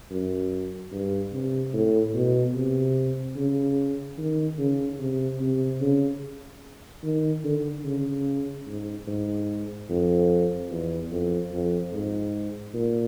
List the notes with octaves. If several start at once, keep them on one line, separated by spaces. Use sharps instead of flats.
F#2
G2
C3
A2
B2
C3
C#3
D#3
C#3
C3
C3
C#3
D#3
D3
C#3
G#2
G#2
F2
E2
F2
F2
G#2
A#2